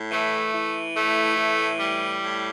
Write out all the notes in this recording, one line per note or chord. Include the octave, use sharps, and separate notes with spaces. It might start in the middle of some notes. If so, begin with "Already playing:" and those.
Already playing: A2
E3 A3
E3
A2 A3
E3
A2 G3
A2